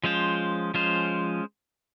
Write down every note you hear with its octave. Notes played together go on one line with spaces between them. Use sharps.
F3 G#3 C#4 F4 C5
F3 G#3 C#4 F4 C5